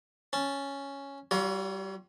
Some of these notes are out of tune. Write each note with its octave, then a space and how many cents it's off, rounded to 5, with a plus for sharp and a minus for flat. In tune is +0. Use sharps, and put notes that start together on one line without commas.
C#4 +0 A5 -5
G3 -25 F4 +35 C#5 +35